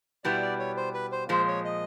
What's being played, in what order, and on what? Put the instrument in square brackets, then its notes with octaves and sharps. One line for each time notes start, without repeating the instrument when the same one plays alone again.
[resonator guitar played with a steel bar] B2 G3 B3 E4 [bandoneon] D5
[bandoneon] D5
C#5
C5
B4
C5
[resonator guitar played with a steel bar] A#2 F3 G#3 [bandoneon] C5
[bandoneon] C#5
D#5